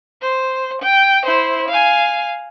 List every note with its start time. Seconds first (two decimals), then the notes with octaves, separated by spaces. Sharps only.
0.22 C5
0.82 G5
1.25 E4 C5
1.68 F5 G#5